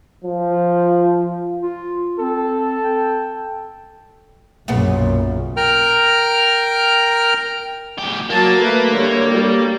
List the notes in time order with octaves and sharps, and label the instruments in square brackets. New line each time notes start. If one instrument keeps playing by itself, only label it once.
[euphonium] F3
[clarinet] F4
[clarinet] C4 [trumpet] A4
[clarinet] G5
[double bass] B1 F#2 [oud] A#2 C#3 B3
[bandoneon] A#4 G5 A#5 F6
[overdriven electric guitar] D2 G4
[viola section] F#3 A5 [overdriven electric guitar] A#3
[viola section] A3 B4
D3 G3 C#5
G3